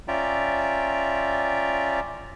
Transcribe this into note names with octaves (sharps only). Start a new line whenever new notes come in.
C#4 F4 D5 E5 G5 A#5